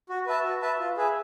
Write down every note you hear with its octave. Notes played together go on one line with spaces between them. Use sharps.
F#4
B4 E5 A5
F#4
B4 E5 A5
F4
G#4 B4 E5